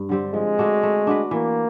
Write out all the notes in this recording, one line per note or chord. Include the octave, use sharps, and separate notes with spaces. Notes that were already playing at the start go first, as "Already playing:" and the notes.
Already playing: G2
D3 G3 C4
F3 G#3
A3 D4 F#4
A3
D4 F#4 B4
E3 A#3